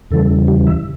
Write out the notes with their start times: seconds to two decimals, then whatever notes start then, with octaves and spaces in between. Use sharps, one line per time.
0.11 E2 C#3 E3 G3 A4
0.48 G4
0.67 E5